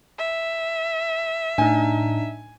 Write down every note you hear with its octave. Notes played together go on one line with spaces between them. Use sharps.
E5
A2 D4 D#4 G#5